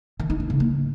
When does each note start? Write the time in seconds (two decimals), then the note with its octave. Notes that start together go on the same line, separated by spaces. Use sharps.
0.20 D#3
0.30 D#4
0.40 D4
0.50 C#3
0.60 A#3